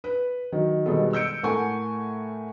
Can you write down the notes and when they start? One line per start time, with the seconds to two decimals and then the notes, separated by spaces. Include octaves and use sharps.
0.04 B4
0.52 D#3 F#3
0.86 B2 D#3 G3 G#3 B3 A4
1.13 E6 G6 C#7 D7
1.43 A2 A3 A#4 F#5 G#5 C#6